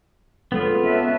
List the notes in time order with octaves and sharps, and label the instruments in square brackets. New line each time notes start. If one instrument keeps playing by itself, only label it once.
[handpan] G#3 C#4 [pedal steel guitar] B3 F4 [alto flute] A4
[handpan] C#4 [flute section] B4 E5 A5